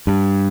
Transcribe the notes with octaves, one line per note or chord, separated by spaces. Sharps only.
G2